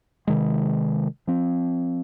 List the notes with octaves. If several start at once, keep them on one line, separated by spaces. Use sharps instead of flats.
C3 D#3 G#3
F3 C4